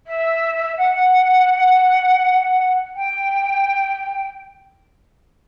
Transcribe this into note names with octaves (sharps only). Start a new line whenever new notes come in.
E5
F#5
G5